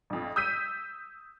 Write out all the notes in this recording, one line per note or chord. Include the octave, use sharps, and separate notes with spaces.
A#1 F2
D#6 E6 G6 B6 D#7